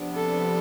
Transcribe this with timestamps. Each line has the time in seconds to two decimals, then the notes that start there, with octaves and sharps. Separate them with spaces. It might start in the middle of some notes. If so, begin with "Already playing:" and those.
Already playing: C3 F3 B3 D4
0.16 A4